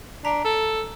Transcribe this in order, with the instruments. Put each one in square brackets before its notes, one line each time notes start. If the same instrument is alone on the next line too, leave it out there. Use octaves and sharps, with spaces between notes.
[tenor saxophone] D4 [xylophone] A#5 B6
[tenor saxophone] A4